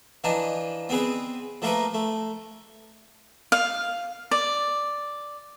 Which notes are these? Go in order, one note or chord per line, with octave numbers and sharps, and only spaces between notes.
E3 F3 D4 D#4 F4
B3 C4 G#4 B4
F3 A3 A#3 A#4 B4
A3
F5
D5